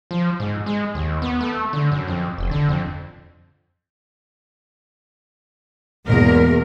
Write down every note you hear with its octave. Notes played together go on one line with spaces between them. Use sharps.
F3
G#2
G#3
D#2
B3
A3
D3
F#2
F2
F1
D3
F2
E2 G#2 B2 A#3 A#4